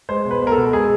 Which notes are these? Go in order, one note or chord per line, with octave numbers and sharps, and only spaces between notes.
G#3 C5
B2
B4
B3
A#4
A4
B2
G#3 G#4